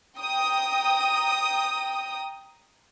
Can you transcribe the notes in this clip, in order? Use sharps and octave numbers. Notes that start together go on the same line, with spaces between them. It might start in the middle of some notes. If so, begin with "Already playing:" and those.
G5 A#5 D#6